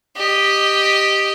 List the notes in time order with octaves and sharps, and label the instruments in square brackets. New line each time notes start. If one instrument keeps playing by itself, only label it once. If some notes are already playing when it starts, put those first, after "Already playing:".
[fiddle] G4 D#5